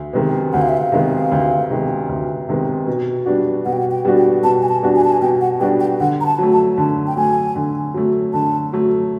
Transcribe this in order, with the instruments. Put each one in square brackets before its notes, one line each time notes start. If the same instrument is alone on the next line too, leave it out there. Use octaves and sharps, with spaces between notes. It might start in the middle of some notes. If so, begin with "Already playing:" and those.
Already playing: [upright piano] D2
C3 D#3 G#3 B3
[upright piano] D2 [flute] F#5
[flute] F5
E5
F5
[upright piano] C3 D#3 G#3 B3
D2
C3 D#3 G#3 B3
D2
C3 D#3 G#3 B3
B2
G3 B3 D4 F#4
[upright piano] B2 [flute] F#5
[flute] G5
F#5
G5
[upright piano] G3 B3 D4 F#4
[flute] G5
[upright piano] B2 [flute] A5
[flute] G#5
A5
[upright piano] G3 B3 D4 F#4
[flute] G#5
A5
G#5
[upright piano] B2 [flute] G5
[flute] F#5
[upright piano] G3 B3 D4 F#4 [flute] G5
[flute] G5
[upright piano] D3 [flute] F#5
[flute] A#5
A5
[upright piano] F#3 A3
[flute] A5
[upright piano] D3 [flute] A5
[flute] G5
[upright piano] F#3 A3 [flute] G#5
[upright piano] D3
F#3 A3
[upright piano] D3 [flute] A5
[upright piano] F#3 A3